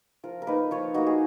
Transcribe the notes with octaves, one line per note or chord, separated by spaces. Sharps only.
F3 A#4
A#4
A#3 D#4 B4
F3 C#5
A#3 D#4 F#4
G#4